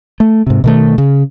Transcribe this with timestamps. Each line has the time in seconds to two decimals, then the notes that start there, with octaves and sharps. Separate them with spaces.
0.20 A3
0.47 G#2 C3
0.64 B2 D#3 A3
0.98 C#3